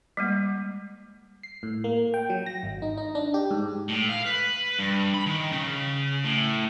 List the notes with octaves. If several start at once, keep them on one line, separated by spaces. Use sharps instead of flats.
G3 G#3 A#3
C7
A2
A#3
G5
F#3
A#6
G#1
D#4
D#4
D4
G4
G#2
A2
F5
B4
G2
B5
D#3
C#3
A2